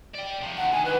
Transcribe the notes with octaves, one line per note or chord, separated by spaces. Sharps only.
D5 G5
C3 F3
D2 F#5
D#3 G#5
D#3 E3 B4